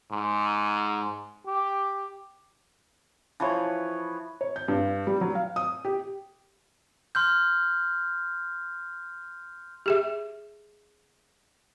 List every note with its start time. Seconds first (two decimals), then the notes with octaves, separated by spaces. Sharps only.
0.11 G#2
1.46 G4
3.40 E3 F3 B4 C#5
4.41 C#5
4.56 G6
4.68 G2
5.07 G3
5.21 F#3
5.35 F5
5.56 D#6
5.85 G4
7.15 C6 F6 G6
9.86 G4 G#4 E5